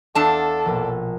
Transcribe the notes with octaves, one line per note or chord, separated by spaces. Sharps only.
E2 D4 A4 F5 F#5 A5 E6
A#1 B2